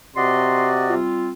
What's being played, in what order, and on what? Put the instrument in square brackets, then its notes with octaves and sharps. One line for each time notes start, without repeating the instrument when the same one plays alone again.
[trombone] C3 [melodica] F#4 D5 D#5 [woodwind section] C6
[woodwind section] G3 C4 F4